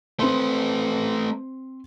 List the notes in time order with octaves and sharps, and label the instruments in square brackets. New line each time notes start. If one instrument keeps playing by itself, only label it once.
[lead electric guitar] A3 B4 [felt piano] C4 C6